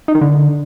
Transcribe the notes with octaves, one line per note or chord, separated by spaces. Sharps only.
D#4
D#3
D3